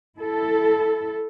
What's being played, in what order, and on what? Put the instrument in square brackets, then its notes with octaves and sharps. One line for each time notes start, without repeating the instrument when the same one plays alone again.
[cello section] E4 A4